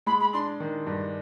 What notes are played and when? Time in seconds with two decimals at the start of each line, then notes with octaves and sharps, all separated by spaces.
0.06 G#3 B5
0.20 B5
0.33 D4 C6
0.60 D#3
0.87 G2